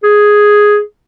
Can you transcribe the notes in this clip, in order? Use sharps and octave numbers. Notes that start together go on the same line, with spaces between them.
G#4